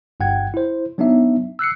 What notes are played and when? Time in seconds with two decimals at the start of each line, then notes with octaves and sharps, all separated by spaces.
0.20 G1 G2 F#5 G5 G#6
0.54 E4 C5
0.98 F#3 B3 D4 D#4 E5
1.59 E6 F#6 C7 C#7